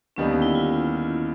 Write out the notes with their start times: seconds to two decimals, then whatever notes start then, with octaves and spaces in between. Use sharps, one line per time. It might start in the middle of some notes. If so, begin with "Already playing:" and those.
0.16 D#2 D3 G3 B3 C#4 D#4
0.42 E4
0.55 F4